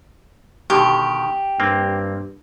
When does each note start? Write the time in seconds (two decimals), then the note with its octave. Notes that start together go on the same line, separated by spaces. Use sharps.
0.70 B2 D3 D#3 G4
1.60 G2 A#3 C4